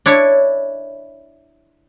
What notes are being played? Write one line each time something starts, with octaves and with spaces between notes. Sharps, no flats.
D4 E4 C#5